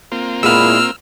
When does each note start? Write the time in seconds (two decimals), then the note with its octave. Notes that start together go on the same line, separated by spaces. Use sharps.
0.12 A#3 C4 F4
0.43 A#2 G#3 B3 E4 E6 F6